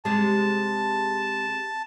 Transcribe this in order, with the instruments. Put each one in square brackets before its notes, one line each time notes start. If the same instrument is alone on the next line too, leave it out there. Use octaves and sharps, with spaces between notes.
[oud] C3 G#3 [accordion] A5